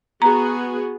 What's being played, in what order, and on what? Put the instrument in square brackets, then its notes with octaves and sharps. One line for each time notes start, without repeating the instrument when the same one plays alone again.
[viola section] B3 F#4 G#4 [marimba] A#5